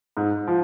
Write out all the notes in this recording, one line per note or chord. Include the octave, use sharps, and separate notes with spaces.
G#2
F3